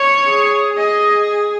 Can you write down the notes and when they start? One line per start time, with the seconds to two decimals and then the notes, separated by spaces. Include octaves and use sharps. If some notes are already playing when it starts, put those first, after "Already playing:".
Already playing: C#5
0.28 G#4
0.77 G#4 D#5